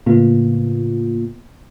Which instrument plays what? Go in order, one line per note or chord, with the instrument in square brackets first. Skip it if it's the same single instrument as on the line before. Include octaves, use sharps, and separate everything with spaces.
[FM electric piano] A2 C#3 A#3 B3 F4